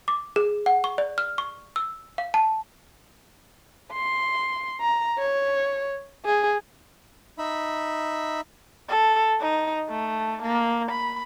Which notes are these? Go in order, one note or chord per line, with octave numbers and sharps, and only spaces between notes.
D6
G#4
F#5
C#6
D5
F6
C#6
E6
F5
A5
C6
A#5
C#5
G#4
D#4 E5 B5
A4
D#4
A3
A#3
B5